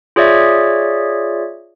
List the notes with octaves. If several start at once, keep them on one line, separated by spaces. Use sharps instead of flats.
F4 G#4 C#5 D5 E5